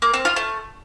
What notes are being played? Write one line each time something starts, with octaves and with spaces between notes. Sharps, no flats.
A#3
C4
F4
A3